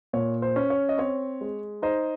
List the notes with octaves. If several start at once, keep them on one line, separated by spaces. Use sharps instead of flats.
A#2 C#5
C5
C#4
C#5
D#5
C4 C#5
G#3
D#4 C5 D#5